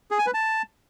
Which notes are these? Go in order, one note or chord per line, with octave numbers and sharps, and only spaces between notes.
G#4
G#5
B4
A5